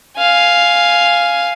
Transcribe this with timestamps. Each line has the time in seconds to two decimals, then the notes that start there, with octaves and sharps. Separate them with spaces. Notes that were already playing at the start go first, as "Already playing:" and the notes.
0.17 F5 G#5